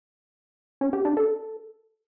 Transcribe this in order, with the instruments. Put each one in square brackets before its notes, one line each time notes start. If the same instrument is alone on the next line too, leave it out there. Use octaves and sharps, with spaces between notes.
[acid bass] C#4
G4
D4
A4